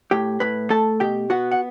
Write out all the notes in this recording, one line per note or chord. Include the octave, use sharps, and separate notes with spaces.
A2 G4 G5
A2 B4 B5
A3 A4 A5
B2 G4 G5
B3 F#4 F#5
F#5